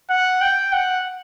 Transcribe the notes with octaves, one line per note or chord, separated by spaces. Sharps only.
F#5
G5
F#5